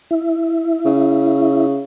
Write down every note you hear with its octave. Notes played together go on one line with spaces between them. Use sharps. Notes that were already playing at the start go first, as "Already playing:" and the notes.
E4
C#3